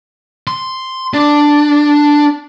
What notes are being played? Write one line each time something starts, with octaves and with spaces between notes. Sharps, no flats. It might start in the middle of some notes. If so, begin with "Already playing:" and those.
C6
D4